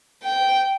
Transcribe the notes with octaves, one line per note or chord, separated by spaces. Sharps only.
G5